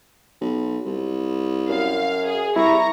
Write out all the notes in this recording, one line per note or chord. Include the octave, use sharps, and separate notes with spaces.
B1
C2
F#2 F5
G#4
C2 E4 A#5 C#6